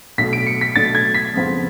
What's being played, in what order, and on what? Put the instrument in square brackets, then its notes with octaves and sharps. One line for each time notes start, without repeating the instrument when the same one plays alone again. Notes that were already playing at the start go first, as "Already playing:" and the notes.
[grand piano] B1 B2 A3 D4 B6
D7
C#7
B6
B1 B2 A3 D4 A6
G#6
B6
F2 C#3 F3 B3